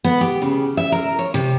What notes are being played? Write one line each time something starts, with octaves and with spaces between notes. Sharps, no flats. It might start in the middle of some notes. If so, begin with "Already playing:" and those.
B3
G4
C#3
E5
A#4
C#5
C3